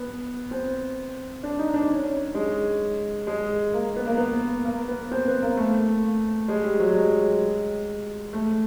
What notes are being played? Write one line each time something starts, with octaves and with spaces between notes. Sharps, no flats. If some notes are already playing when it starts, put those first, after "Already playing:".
Already playing: B3
C4
D4
D#4
D4
C#4
C#4
G#3
G#3
A#3
B3
A#3
B3
A#3
B3
C4
B3
A#3
A3
G#3
G3
F#3
G#3
A3